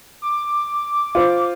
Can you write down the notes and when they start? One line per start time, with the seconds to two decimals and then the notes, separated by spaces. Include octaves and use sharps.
0.22 D6
1.15 F4 C5